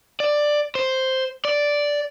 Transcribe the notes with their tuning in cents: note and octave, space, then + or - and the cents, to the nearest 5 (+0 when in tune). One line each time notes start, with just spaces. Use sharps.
D5 +10
C5 +0
D5 -5